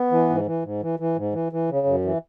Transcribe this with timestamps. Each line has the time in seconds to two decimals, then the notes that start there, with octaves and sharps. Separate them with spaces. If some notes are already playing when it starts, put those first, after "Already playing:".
Already playing: B3
0.12 E3
0.29 G#2
0.46 E3
0.64 G#2
0.82 E3
1.00 E3
1.17 G#2
1.34 E3
1.52 E3
1.70 C#3
1.86 F#2
2.05 E3